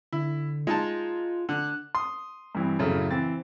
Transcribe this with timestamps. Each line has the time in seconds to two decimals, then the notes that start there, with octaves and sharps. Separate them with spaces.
0.13 D3 E4
0.67 G#3 D#4 F4 A5
1.49 D3 F#6
1.95 C6 D#6
2.55 G2 E3 C4
2.79 F#2 A2 C#3 A4
3.11 E3 C4 A6